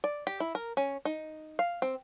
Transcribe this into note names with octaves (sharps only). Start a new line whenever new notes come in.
D5
G4
E4
A#4
C#4
D#4
F5
C4